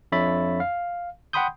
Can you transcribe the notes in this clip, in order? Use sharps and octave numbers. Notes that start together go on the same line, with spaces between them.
F2 D4 C#5 E5 B5 A6
F5
F#5 G5 B5 C6 D#6 G6